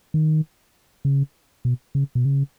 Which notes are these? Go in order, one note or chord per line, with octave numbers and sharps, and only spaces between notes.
D#3
C#3
B2
C#3
B2
C#3